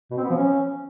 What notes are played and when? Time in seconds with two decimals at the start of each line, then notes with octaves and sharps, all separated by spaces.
0.11 B2
0.17 C4
0.24 B3
0.30 F3
0.36 C#4